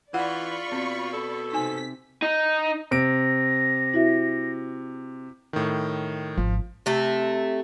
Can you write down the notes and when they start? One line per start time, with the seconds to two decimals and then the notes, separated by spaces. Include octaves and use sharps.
0.14 E3 F4 D5 F#5 B5 C#6
0.72 B2 C4
1.13 A4
1.52 C3 D#4 G#5 B6
2.22 D#4
2.91 C3 A#6 D7
3.94 E4 F#4 E5
5.53 A2 D#3
6.37 G#1 F3
6.86 C3 A3